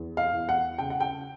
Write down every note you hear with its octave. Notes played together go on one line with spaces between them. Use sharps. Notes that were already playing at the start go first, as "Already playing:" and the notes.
Already playing: E2
F5
E2
F#5
C#3 G5
F#5
G5